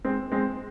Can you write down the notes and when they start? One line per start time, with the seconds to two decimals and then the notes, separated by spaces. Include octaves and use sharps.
0.05 G#3 C4
0.32 G#3 C4